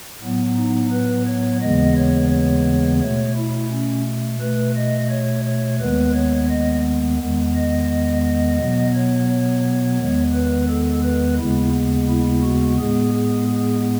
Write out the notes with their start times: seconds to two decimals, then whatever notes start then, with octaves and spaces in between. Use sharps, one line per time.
0.21 A2 F#3 B3
0.57 D#4
0.92 B4
1.26 C#5
1.61 D#2 C#3 E3 G#3 B3 D#5
1.96 C#5
2.30 C#5
3.00 B2 A3 C#5
3.36 E4
3.71 C#4
4.40 B2 A3 B4
4.76 D#5
5.10 C#5
5.45 C#5
5.80 D#2 D#3 G#3 B3 B4
6.14 C#5
6.50 D#5
7.19 E2 D#3 G#3 B3
7.55 D#5
8.24 D#5
8.59 B2 F#3 B3
8.94 C#5
9.29 C#5
10.00 E2 D#3 G#3 B3
10.34 B4
10.68 A4
11.03 B4
11.38 D#2 C#3 G#3 B3 E4
12.09 E4
12.43 F#4
12.78 A2 G#3 B3 G#4
13.13 G#4
13.48 G#4